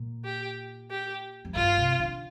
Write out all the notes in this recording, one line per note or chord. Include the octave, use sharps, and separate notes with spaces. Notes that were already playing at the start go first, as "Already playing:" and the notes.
Already playing: A#2
G4
G4
F2
G2 F4
C3
D3